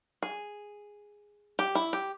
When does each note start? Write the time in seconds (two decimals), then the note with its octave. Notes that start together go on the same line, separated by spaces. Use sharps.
0.22 G#4
1.59 G4
1.75 E4
1.93 G4